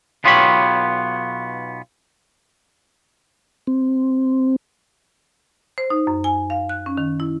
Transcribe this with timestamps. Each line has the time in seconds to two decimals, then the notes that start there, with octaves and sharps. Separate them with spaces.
0.24 B1 B3 F4 G4 C#5 B5
3.67 C4
5.78 C5
5.90 D#4
6.07 F#2
6.24 G#5
6.50 F5
6.69 F#6
6.86 C#4
6.98 D#3
7.20 E4